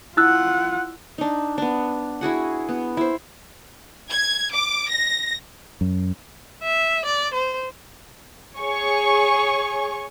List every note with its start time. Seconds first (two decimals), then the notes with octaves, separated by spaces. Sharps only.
0.17 E4 F4 F#5 E6 F#6
1.18 D4 D#4
1.58 B3 D4
2.21 E4 F#4 G#4 F#5
2.69 B3
2.97 E4 C5
4.10 G#6
4.53 D6
4.91 A#6
5.81 F#2
6.63 E5
7.06 D5
7.35 C5
8.57 G#4 C#5 G#5 C#6